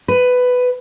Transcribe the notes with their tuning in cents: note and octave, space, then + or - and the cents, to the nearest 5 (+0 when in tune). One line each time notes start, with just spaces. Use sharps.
B4 +10